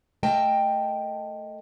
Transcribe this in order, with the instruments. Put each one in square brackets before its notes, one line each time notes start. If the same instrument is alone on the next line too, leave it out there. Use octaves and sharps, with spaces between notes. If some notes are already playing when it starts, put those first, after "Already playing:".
[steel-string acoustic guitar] A3 A#4 D#5 G5 A5